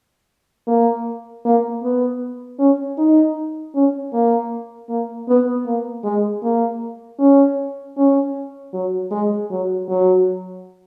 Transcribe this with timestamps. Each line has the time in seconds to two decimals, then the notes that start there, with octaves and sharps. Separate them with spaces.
0.68 A#3
1.45 A#3
1.83 B3
2.59 C#4
2.98 D#4
3.75 C#4
4.13 A#3
4.89 A#3
5.28 B3
5.66 A#3
6.04 G#3
6.43 A#3
7.19 C#4
7.97 C#4
8.73 F#3
9.11 G#3
9.50 F#3
9.89 F#3